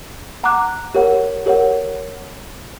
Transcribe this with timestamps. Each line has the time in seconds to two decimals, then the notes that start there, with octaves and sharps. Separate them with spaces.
0.43 F#5 A#5 D6 F#6
0.95 G4 A#4 C#5 F#5
1.46 G4 A#4 C#5 F#5